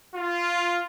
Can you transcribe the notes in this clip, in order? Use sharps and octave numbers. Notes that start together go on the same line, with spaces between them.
F4